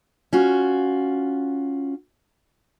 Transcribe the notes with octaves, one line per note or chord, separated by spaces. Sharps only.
C#4 F4 F#4